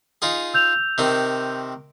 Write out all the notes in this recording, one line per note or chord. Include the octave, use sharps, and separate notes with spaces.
D#4 F4 G#4
E6 G6 F7
C3 D#3 C4